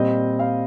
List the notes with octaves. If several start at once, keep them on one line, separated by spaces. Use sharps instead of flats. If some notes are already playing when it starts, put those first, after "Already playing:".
Already playing: A#2 G3 C4 D#5
F5